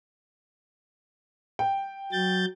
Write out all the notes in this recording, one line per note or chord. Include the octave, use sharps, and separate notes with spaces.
G5
F#3 G6 A6